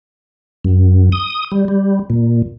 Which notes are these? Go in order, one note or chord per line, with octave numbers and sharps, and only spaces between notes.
F#2
D#6
G3
G3
A#2